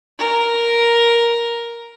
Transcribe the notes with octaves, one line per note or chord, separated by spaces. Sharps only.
A#4